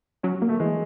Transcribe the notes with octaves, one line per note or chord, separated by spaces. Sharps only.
F#3 C#4
A#3
A3
E3 G#3